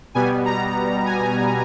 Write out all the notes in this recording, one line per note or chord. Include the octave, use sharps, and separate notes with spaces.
B2 G3 B3 G#5
A#5
G#5